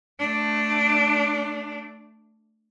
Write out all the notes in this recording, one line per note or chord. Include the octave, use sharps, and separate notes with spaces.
A3 D4